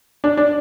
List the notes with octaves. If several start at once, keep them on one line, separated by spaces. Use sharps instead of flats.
D4
D4